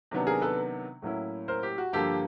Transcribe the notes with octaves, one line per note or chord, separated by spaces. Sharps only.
C3 D#3 F#3 B3 D4
G#4 A#4
A4 B4
A2 F#3 A#3 C#4 E4
A#4 C5
G4
F#4
G2 D3 F3 A#3 G4 A4